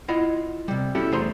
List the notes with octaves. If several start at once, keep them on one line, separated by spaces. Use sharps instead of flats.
E4 F4 D#5 F#5
C3 G3
C#4 E4 F#4 G4 A4
E2 A3 G#4 C5 A#5 C6